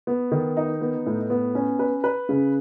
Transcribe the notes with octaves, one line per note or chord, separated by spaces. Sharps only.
B3
D#3
D#4
B3
A2
B3
C#4
B4
B4
C#3